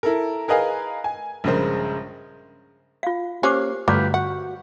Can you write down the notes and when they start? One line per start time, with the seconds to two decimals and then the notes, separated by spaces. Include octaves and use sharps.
0.03 E4 A4 A#4
0.48 G#4 A#4 B4 D#5 F5 G#5
1.04 G#5
1.44 A#1 G2 C#3 G#3 A#4 C5
3.03 F4 F5
3.43 A#3 C#4 G4 C5 D6 C7
3.88 G2 D3 F#3 A3 F4 G4 B4 D6
4.14 F#4 F#5